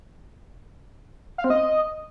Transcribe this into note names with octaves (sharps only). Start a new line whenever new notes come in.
F5
C4
D#5